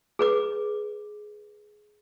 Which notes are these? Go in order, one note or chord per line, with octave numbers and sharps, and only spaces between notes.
G#4 B4 D6